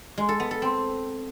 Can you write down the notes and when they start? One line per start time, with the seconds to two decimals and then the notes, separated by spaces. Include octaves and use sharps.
0.18 G#3
0.29 A4
0.40 B3
0.51 A4
0.62 C4